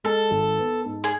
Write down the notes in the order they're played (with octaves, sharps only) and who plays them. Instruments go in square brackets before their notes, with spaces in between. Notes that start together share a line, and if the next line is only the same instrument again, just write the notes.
[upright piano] G#3 [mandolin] A4
[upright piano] G#1
B3
G#2
[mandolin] G#4